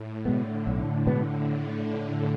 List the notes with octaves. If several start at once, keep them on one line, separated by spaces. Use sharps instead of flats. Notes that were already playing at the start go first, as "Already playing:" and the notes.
Already playing: A2
B2 D3 G#3 B3
B1
B2 G#3 B3